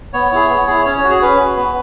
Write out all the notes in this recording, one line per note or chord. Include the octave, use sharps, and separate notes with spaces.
B3 C#5
E4 G#4
B3
E4 G#4
C#4 C#5
C#5
F#4
G#4
C#4 B4
F#4
B3